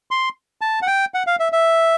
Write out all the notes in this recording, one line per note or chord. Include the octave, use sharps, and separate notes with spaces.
C6
A5
F#5
G5
F#5
F5
E5
E5